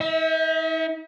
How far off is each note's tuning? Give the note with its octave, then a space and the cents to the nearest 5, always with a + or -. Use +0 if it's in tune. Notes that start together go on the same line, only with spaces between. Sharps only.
D#4 +45 E5 -25